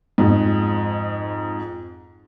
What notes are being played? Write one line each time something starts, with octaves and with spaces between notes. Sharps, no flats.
F2 G#2